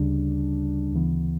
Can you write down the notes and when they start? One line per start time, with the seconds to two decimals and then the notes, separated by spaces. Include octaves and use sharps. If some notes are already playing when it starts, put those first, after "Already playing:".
Already playing: D2 C#3 G3 D4
0.92 D2 C#3 E3 B3